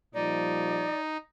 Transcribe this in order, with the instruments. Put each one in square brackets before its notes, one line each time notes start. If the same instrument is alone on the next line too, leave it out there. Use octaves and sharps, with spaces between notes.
[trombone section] A#2 F3 G3 [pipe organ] D#4 [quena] D5